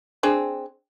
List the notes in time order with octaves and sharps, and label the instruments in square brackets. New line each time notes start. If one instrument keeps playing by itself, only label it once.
[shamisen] C4 D4 G#4